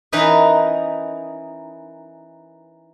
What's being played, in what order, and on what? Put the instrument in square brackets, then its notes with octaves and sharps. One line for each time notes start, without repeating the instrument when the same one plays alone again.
[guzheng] E3 C#4 D#4 A#4 B4 E5